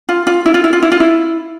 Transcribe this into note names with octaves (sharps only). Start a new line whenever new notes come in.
F4
F4
E4
F4
E4
F4
E4
F4
E4